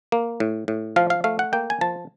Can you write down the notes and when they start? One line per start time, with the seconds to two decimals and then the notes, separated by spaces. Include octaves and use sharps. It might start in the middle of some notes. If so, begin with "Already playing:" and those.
0.12 A#3
0.40 A2
0.68 A2
0.96 F3 F5
1.10 F5
1.24 A3 F5
1.39 F#5
1.53 A#3 G5
1.70 G#5
1.81 F3 A5